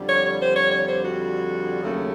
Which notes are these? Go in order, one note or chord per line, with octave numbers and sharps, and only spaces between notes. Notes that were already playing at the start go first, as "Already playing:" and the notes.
Already playing: F2 D3 G3
C#5
C#5
C5
C#5
C#5
C5
F#4
D#2 C#3 F#3 A3